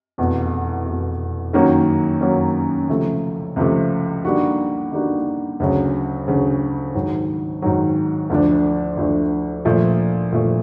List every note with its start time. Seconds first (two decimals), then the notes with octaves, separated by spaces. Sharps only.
0.18 F1 E2 B2
0.86 F1 E2 B2
1.53 F#2 D#3 F#3 A#3 C#4
2.21 F#2 D#3 F#3 A#3 C#4
2.89 C#2 C3 F3 A3
3.56 C#2 C3 F3 A3
4.25 D3 G3 A#3 D#4 F#4
4.92 D3 G3 A#3 D#4 F#4
5.60 D2 C#3 F#3
6.27 D2 C#3 F#3
6.95 G#2 D#3 F#3
7.62 G#2 D#3 F#3
8.30 D2 D3 F3 A3 D4
8.97 D2 D3 F3 A3 D4
9.65 A#2 F3 A3
10.32 A#2 F3 A3